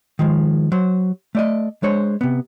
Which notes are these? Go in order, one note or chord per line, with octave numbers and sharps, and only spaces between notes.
D#3 F3 G#3
F#3 C5
A3 D5 D#5
G#3 D4 C5 C#5
C3 B3